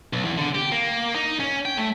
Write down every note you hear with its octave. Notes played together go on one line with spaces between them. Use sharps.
B1
E2
D3
G4
A#3
D#4
C#4
G5
A3